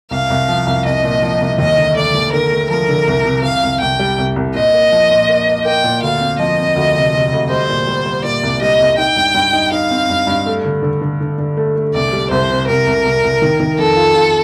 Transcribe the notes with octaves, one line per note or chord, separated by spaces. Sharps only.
C2 F5
C2
F3
C2
C2 D#5
A#2
F3
C2
D#2 D#5
D3
A3 D5
D#2
D3 A#4
A3
F3 A#4
D3
C2
C3
C3 F5
C2
C2 G5
G3
C2
C2
A#2 D#5
A#3
F3
A#2
A#3
A#3
A#3 G5
A#2
D2 F5
C4
F3 D#5
C4
D2
C3
C3
D2
G3 C5
A#2
G3
G3
A#2 D5
C2
G3 D#5
C2
D#4 G5
G2
G2
D#4
D#4 F5
C4
G2
G2
A3
D3
D3
D3
D3
D3
A3
A3
C2 D5
G3
C2 C5
C3
C2 A#4
C2
C2
C2
D#3
D#3
F2 A4
F4
F4